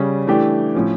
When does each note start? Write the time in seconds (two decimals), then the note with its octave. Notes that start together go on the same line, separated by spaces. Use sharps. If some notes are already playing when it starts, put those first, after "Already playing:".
Already playing: C#3 G3 C#4
0.27 E3 A3 D4 G4
0.75 A2 F3 C#4